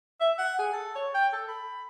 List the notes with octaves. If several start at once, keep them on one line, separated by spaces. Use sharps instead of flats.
E5
F#5
G#4
A4
C#5
G5
A4
B5